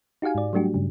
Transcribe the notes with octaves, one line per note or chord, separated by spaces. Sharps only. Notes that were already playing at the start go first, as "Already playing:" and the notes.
D#4 F#4 G4 F5 G#5
G#2 D5
F#3 G3 A3 D4 F#4 G4
G2 C#3